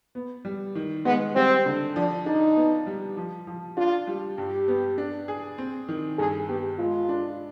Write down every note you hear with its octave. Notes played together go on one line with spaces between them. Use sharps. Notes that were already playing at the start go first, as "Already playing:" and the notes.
B3
G3
D#3
G#3 B3
G3 C4
D3
F3 D4
D4 D#4
B3
G3
F3
F3
D4 F4
G3
G2 G4
B3
D4
G#4
C4
D#3
G2 G#4
B3 G4
G#3 F4
D4